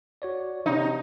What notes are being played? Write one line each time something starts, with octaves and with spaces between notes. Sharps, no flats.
F#4 C#5 D5
C3 D#4 D#5